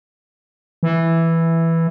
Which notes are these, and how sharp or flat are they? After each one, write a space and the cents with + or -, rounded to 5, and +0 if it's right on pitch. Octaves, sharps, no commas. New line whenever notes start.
E3 +0